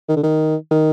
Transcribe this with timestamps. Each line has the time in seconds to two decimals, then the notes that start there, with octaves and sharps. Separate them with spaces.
0.09 D#3
0.16 D3
0.23 D#3
0.71 D#3